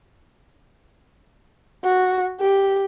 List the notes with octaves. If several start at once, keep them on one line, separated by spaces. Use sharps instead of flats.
F#4
G4